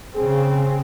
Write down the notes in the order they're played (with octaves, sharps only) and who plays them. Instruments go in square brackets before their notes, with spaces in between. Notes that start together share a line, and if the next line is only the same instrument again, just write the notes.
[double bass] C#3 C4 [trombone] G#4